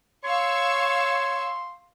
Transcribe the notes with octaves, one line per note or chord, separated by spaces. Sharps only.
C#5 F5 C6 C#6 E6